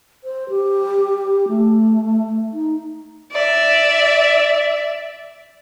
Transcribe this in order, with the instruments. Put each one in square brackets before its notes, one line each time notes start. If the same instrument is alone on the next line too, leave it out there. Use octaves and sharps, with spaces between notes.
[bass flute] C5
G4
A3
D#4
[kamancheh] D5 E5